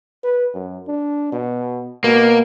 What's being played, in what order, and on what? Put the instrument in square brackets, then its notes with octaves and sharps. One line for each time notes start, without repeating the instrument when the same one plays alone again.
[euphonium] B4
F#2
D4
B2
[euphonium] B2 [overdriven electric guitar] A#3